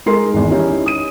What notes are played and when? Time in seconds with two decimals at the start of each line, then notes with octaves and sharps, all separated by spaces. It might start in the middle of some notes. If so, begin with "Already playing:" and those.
0.06 G#3 D#4 A#4 C6 C7
0.34 G#1 E2
0.50 C#4 D#4 E4 G4
0.86 D#6 D#7